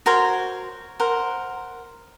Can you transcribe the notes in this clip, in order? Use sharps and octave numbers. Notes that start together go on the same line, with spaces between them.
F#4 A#4 C5 C#5
A#4 C5 F#5